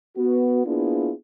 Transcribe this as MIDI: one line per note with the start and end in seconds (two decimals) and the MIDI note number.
0.17 0.61 59
0.17 0.61 66
0.66 1.12 58
0.66 1.12 59
0.66 1.12 62
0.66 1.12 64
0.66 1.12 65
0.66 1.12 68